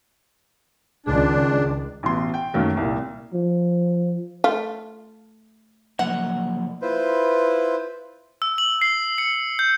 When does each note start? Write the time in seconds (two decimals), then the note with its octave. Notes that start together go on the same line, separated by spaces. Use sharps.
1.06 C#2 D#3 D4 G#4
2.03 A1 B2 C6
2.34 G5
2.54 F#2 D#3 F#3 A3 A#3
2.77 C2 A#2
3.34 F3
4.44 A3 F4
5.99 F3 F#3 A#3 F#5
6.82 E4 F4 B4 C5
8.42 E6
8.58 F#7
8.81 C7
9.18 C#7
9.59 G6